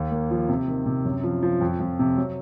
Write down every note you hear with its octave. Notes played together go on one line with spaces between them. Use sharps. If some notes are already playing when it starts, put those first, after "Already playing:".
Already playing: D#2
A#3
F3
C3
D#3
C3
F#2
F3
F3
F2
F2
C3
F#3